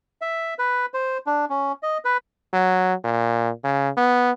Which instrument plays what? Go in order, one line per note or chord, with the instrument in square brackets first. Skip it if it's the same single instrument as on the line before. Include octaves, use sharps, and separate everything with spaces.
[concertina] E5
B4
C5
D4
C#4
D#5
B4
[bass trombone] F#3
A#2
C#3
B3